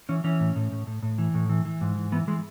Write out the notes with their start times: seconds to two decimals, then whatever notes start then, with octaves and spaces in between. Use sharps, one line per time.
0.09 E3 C#4
0.24 E3 C#4
0.40 A2
0.56 A2
0.72 A2
0.87 A2
1.03 A2
1.18 E3
1.34 A2
1.49 E3
1.65 E3
1.81 G#2
1.96 E3
2.12 E3 B3
2.27 E3 G#3